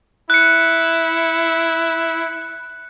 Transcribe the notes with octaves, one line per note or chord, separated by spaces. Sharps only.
E4 F#6 C#7